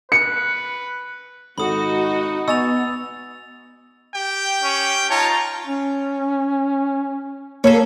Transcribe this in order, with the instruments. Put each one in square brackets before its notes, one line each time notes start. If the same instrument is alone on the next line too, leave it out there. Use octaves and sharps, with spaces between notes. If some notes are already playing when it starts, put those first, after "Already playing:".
[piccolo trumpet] B4 [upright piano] C#7
[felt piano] G#1 A4 [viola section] D#4 F#4 [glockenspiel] B5 D#6
[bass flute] B3 [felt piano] D#5 G#5 C#6 [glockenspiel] E6 A6 F7
[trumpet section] G4 G5
[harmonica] C#4
[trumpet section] D#4 C#5 [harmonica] F4 A5 A#5
[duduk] C#4
[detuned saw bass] A#3 [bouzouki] C#4 G#4 A4